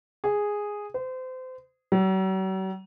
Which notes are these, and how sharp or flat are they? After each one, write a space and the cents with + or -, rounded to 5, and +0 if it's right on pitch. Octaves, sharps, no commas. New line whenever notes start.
G#4 -5
C5 -30
F#3 +45